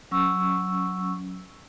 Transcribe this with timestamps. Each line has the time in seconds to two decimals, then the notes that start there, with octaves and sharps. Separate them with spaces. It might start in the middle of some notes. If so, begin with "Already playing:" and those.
0.11 F#3 C#4 C#6 E6